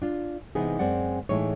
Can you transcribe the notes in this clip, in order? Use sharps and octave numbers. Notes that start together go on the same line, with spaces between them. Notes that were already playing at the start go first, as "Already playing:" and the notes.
D4 F4
C3 E3 G#3 B3 D#4 G#4
F#2 G#3 C4 D5 F#5
A2 E3 G#3 A3 D#4 C#5